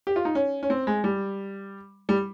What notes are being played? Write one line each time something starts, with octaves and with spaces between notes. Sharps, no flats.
G4
F4
D#4
C#4
C#4
C4
G#3
G3
G3